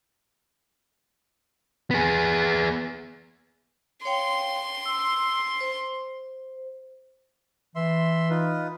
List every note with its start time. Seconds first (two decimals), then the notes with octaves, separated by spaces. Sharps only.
1.91 B3 G#4
4.05 C#5 F5 G5 C6
4.85 E6
5.61 C5
7.76 E3 E5 C6
8.30 D#4 F4 B4